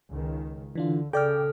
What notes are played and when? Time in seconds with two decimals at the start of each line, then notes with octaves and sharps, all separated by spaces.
0.11 C#2 D#3
0.76 D3 E3 D4 F4
1.13 C#3 A4 D5 G5 F6